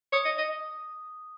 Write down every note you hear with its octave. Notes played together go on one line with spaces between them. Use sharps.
C#5 D#6
D#5
D#5